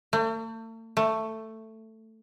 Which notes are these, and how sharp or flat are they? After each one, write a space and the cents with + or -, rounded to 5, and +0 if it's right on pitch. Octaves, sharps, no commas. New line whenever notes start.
A3 +40
A3 +10